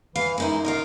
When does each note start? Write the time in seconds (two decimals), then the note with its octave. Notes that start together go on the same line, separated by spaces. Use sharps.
0.15 E3 F5
0.38 F#2 G#3 D#4 E4
0.65 F4 A#4 D#5